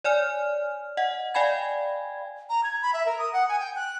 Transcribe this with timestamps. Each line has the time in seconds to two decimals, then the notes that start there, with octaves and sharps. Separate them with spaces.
0.04 C#5 D5 G#5 F6
0.97 D#5 F#5
1.34 D5 F5 G5 G#5 B5 G#6
2.49 A#5
2.64 G#6
2.82 B5
2.93 E5
3.06 A#4
3.18 D#6
3.33 F#5
3.49 G#5
3.60 G5
3.76 F#6